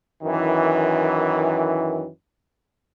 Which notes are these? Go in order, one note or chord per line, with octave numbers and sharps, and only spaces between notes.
F#2 D#3 E3